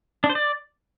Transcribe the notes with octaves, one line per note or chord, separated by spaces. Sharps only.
D4
C5
D5